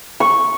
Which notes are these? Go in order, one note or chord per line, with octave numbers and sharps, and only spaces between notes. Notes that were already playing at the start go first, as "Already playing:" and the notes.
C#6